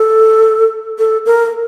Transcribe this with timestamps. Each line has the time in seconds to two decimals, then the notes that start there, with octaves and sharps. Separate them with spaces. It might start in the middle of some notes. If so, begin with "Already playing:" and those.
Already playing: A4
0.99 A4
1.26 A#4